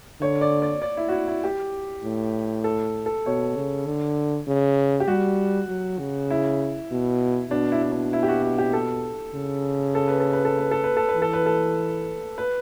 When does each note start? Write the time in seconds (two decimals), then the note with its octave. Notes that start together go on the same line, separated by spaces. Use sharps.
0.21 D3 C#5
0.41 D5
0.62 D5
0.82 D5
0.97 E4
1.08 F#4
1.12 E4
1.28 E4
1.44 G4
2.04 A2
2.64 A4
3.06 A4
3.26 B2 C#5
3.57 C#3
3.86 D3
4.47 C#3
5.00 G4
5.08 G3 F#4
5.69 F#3
5.99 C#3
6.30 E4
6.91 B2
7.51 B2 D4
7.72 E4
7.82 E4
7.92 D4
8.13 E4
8.23 G4
8.28 F#4
8.42 F#4
8.58 G4
8.73 A4
9.34 C#3
9.95 A4
10.08 B4
10.20 A4
10.33 B4
10.45 A4
10.58 B4
10.71 A4
10.84 B4
10.97 A4
11.09 B4
11.16 E3
11.22 A4
11.33 B4
11.46 A4
12.38 B4